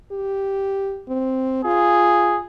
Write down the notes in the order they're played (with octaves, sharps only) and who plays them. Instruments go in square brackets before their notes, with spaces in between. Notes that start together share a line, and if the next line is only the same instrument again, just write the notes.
[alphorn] G4
C4
[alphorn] F4 [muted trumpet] G#4